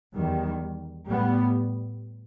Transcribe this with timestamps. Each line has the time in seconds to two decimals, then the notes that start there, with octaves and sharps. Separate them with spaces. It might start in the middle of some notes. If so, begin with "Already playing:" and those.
0.14 E2 D#3 G3
1.07 A2 G3 B3